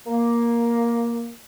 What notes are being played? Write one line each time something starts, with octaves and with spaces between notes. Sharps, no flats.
A#3